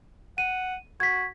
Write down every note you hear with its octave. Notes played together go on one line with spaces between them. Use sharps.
F#5 D#7
F#4 G#6 B6